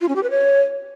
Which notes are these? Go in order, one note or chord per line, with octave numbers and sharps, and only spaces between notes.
F4
C#4
G4
B4
C#5